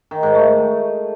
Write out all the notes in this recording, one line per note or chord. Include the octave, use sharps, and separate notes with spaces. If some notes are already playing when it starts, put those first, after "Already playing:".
D#3
G#2
A3